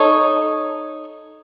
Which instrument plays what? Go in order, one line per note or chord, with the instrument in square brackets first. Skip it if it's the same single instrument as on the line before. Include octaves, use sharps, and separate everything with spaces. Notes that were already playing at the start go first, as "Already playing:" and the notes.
Already playing: [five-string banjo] D#4 A4 C#5